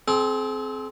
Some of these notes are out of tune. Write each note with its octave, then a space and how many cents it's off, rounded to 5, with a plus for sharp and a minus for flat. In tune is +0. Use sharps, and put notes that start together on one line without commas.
C4 +0 G#4 +45